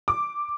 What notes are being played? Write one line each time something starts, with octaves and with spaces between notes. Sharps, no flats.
D6